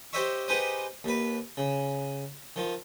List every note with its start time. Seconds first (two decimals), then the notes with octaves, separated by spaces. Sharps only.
0.13 G4 C5 C#5 D#5 E5 C#6
0.48 D#4 G4 G#4 B4 C5 D#5
1.04 D#2 B4
1.57 C#3
2.56 D#3 F3